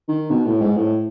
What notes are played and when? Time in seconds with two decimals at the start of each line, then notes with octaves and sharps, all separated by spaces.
0.08 D#3
0.31 B2
0.46 A2
0.61 G#2
0.76 A2